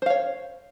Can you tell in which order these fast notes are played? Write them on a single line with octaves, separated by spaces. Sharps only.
C5 F5 C#5